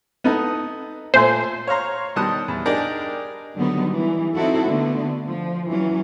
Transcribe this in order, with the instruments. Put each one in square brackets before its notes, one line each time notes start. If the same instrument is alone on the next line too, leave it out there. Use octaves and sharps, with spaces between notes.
[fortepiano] B3 D#4 A4
[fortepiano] A#2 A3 G#5 [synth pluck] C5
[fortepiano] C#5 F5 A#5 C6
B2 D#3 G3 A5 D#6 F#6
E2
D4 D#4 G4 G#4 A#4 D5
[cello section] D3 D#3 F#3 G3 B3 D#4
E3 G3
C4 D#4 E4 F#4 A4
D3 A3 B3
F3
E3 F#3 C#4